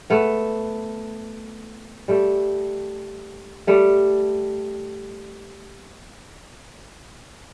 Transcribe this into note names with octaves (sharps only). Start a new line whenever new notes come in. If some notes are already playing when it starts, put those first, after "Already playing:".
A3 B3
G3 A3
G3 A3